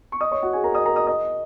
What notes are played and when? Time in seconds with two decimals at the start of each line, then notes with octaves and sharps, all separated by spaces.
0.12 C#6
0.20 D#5 D#6
0.31 C#5 C#6
0.42 F#4 F#5
0.53 G#4 G#5
0.64 A#4 A#5
0.75 D#5 D#6
0.86 A#4 A#5
0.96 D#5 D#6
1.07 D#5 D#6